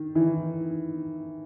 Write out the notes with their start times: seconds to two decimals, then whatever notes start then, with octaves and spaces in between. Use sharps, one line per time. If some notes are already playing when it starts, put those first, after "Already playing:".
Already playing: D#3
0.15 E3